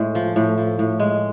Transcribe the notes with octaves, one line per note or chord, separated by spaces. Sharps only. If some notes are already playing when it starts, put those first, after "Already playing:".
Already playing: A2 G#3
F3
A2
F3
A2
G#3